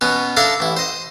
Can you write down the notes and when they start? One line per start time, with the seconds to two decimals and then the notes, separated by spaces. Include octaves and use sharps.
0.01 B2 B3 C#4
0.37 D4 E4 A4 F5 A#5
0.60 A1 E4
0.77 C5 D#5